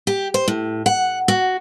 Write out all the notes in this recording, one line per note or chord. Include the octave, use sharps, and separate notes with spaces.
G4
C5
A2
F#5
F#4